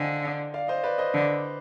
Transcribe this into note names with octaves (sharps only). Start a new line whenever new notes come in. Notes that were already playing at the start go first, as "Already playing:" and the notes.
Already playing: D3 C5 D5 D#5 F5 G5 G#5
D5 F5
C5 D#5
B4 D5
C5 D#5
D3